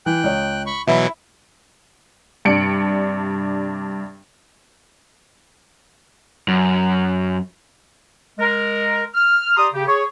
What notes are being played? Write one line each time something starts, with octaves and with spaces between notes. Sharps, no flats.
E3 G5 F#6
C#2 C#5
B5 C#6
B2 E3 F#3 E4 E5 B5
G2 C3 D4 C#7 D7 F#7
F#2
G#3 A#4
F6
G4 D5 A#5 C6 D#6
C#3 G4
G#4 C#5